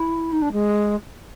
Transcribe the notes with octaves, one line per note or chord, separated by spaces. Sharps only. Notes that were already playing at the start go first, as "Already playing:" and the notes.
Already playing: E4
D#4
D4
G#3